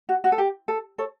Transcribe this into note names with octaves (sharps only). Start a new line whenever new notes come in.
F#4
F#4
A4
G4
A4
A4 C#5